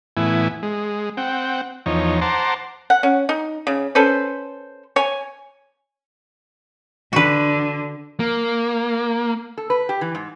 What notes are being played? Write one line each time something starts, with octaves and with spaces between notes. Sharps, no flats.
A2 E3 B3 E4 G#5
G#3
C4 F#5 G5
E2 F3 D#4 C#5
C5 F#5 A5 A#5 C6 D6
F#5
C#4
D#4
C#3
C#4 A4 B4 C5
C#5 G#5
D3 F#4 B4
A#3
A4
B4
G4
E3
G#2